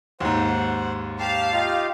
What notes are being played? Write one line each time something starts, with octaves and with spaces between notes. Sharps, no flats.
D#2 G#2 C5 F#5
G4 F5 A5
D#4 F4 G4